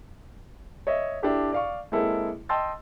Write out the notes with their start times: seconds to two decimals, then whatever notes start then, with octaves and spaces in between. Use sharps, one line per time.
0.87 C#5 D#5 E5
1.22 D4 E4 G4 A4
1.52 D5 F5 C#6
1.92 G#3 A#3 C4 E4 A4
2.49 D#5 G5 A5 C6 E6 A6